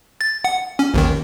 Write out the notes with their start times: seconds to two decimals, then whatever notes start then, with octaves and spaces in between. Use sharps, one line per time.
0.21 A6
0.44 F#5
0.79 C#4
0.94 A1 D#2 D#3